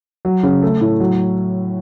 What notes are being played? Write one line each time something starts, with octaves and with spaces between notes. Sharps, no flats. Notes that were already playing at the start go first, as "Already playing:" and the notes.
F#3
C#3
A3
A2
F#3